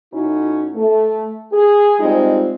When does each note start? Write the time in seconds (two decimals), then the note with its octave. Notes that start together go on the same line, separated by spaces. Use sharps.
0.12 A2 C#4 D#4 E4 F#4
0.74 A3
1.53 G#4
1.99 G3 G#3 C4 D#4 F4